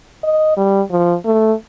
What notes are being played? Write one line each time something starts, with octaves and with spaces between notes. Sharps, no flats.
D#5
G3
F3
A3